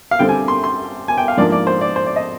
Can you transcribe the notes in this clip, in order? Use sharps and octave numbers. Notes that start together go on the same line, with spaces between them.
F5
D3 G3 C4 G5
G#5
C6
C6
G#5
G5
F5
G#2 F3 A#3 D4 D5
D5
C5
D5
C5
D5
D#5